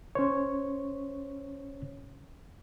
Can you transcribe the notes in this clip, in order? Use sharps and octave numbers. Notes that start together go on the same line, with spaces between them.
C#4 C5 C#5